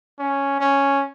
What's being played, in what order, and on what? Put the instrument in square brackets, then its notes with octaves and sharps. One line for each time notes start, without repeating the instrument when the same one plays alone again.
[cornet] C#4
C#4